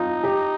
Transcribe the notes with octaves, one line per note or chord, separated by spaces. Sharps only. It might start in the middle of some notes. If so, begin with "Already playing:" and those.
Already playing: C4 D#4 F4
G4